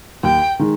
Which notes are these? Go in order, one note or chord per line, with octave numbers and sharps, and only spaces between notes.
D#2 G5
D#3 G#3